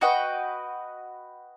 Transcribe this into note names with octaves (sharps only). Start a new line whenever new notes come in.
F#4 B4 D#5 G5